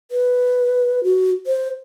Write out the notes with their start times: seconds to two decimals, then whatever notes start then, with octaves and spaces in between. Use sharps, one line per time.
0.11 B4
1.04 F#4
1.47 C5